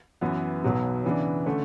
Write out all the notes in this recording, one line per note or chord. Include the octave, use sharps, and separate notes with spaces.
F#2 E3 B3
B1 B2 F#3 B3
C#3 E3 B3 D4
D3 A3 C#4